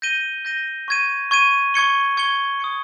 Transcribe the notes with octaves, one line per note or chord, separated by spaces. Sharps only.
G6 A#6 D#7 G7
G6 A#6 D#7 G7
C#6 G#6 D#7
C#6 G#6 D#7
C#6 G#6 C#7 G7
C#6 G#6 C#7 G7
D#6 G#6 C#7